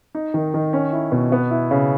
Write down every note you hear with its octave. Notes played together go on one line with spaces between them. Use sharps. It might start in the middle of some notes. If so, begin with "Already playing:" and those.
D#4
D#3
D#3
C#4
E4
B2
B3
E4
C#3